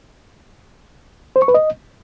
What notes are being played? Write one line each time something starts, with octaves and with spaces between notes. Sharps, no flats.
C5
C#6
B4
D#5